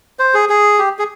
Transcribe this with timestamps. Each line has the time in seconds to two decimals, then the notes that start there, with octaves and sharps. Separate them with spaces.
0.19 C5
0.34 G#4
0.49 G#4
0.79 G4
0.99 G#4